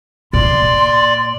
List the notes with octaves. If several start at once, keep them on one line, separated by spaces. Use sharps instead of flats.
A#2 D5 C6